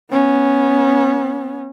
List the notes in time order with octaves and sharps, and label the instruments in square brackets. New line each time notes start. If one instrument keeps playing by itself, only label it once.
[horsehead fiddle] B3 C#4